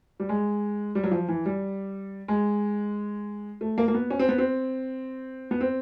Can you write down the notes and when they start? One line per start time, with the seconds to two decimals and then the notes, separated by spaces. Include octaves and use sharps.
0.20 G3
0.29 G#3
0.95 G3
1.03 F#3
1.11 F3
1.28 E3
1.46 G3
2.28 G#3
3.61 A3
3.78 A#3
3.88 A#3
3.94 B3
4.10 C#4
4.19 C4
4.29 B3
4.38 C4
5.51 B3
5.61 C4